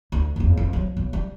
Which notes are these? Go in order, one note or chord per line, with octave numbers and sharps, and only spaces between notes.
D2
F#1 E2
F2
F3 F#3
B1
G3